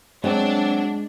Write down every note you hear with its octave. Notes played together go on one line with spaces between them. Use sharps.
F#3 G#3 C4 D4